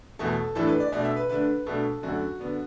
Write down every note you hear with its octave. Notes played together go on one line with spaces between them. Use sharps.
E2 B2 A3 A4
A2 E3 A3 D4 A4
B4
D5
B2 A3 D4 D5
E5
B4
D3 A3 D4 B4
B2 A3 D4 A4
F#2 D3 A3 D4 F#4
D3 B3 D4